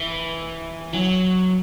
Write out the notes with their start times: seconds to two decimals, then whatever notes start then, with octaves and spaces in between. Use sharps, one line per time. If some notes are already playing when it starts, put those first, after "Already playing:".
Already playing: E3
0.94 F#3